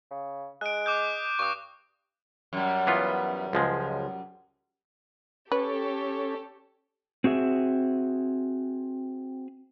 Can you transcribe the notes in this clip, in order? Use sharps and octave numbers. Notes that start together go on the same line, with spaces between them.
C#3
G#3 F#6 D7
D6 D#6 G6
G2 C#6 D#6
F#2 G3
E3 B3 F4
C#2 F3 G#3
C#4 G4 A4 B4 C#5
C4 F#4 G#4 E5